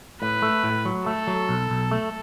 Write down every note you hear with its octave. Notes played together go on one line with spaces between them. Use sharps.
A2 B4
A3
A2
F#3
A3 A4
F#3
B1
B1
A3